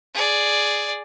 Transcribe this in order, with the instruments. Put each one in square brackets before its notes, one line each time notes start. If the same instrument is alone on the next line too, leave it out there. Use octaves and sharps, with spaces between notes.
[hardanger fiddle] G#4 D5